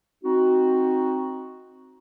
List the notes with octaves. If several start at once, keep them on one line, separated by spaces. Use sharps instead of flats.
C4 D#4 F#4